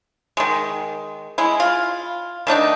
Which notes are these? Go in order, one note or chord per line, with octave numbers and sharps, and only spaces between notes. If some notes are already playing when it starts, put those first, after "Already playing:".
D#3 G#3
G#3 E4
F4
D#3 A3 D4 D#4